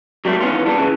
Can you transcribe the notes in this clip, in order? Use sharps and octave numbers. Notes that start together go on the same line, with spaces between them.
F#3 G3 A3 A#3 C4
D#3 E3 G3 B3 C#4 F4
A#2 G3 B3 D4
C#3 E3